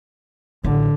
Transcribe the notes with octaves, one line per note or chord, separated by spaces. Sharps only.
A1 D3